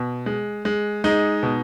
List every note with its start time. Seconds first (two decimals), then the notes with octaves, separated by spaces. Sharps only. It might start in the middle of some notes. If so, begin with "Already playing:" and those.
Already playing: B2
0.26 G#3
0.65 G#3
1.04 G#3 D#4
1.43 B2